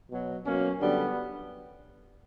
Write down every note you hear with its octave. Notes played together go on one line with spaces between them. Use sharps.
B2 F#3
B2 F#3 A#3 C#4
F#2 D3 G3 B3 D4